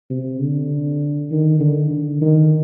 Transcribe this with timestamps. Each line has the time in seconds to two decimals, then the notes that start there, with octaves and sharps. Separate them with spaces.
0.10 C3
0.41 D3
1.31 D#3
1.60 D3
1.91 D3
2.21 D#3